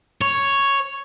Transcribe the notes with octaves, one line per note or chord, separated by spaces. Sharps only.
C#5